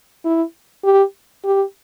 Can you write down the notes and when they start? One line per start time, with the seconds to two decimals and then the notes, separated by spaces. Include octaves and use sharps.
0.25 E4
0.84 G4
1.44 G4